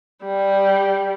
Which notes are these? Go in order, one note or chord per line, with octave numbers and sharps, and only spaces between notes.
G3